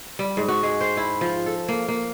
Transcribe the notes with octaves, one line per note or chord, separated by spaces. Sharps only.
G3
G#2
F#4
G#3
C5
E4
F3
A4
A#3
A#3